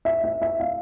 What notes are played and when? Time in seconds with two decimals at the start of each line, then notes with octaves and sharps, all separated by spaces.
0.05 E5
0.24 E5
0.42 E5
0.60 F5